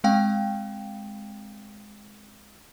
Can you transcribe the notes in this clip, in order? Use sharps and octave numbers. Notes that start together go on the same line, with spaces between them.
G#3 C4 F5 G5